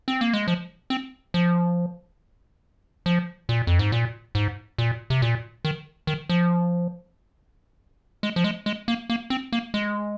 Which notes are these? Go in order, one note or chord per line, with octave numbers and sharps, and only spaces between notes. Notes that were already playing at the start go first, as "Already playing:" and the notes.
C4
A#3
G#3
F3
C4
F3
F3
A#2
F2
G#2
A#2
G#2
A#2
C3
A#2
D#3
D#3
F3
G#3
F3
G#3
G#3
A#3
A#3
C4
A#3
G#3